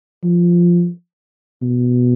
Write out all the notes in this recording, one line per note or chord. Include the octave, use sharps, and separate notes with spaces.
F3
B2